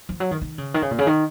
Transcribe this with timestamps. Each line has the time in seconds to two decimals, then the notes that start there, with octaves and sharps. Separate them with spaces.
0.09 F3
0.20 F#3
0.31 D#3
0.41 D#3
0.58 C#3
0.74 D#3
0.82 C#3
0.91 A#2
0.99 C#3
1.07 D#3